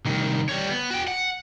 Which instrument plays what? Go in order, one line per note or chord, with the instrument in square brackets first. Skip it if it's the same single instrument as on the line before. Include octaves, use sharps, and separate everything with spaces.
[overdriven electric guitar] C2 D#3
G3 C#5
B3
F#4 G5
F#5